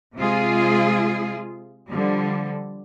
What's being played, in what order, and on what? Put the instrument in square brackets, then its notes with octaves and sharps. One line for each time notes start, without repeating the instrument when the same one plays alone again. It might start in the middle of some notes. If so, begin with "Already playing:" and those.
[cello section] C3 G#3 F4 G#4
D3 F3 G3